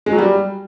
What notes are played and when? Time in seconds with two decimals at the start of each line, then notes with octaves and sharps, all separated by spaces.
0.06 G#3
0.12 F#3
0.18 G3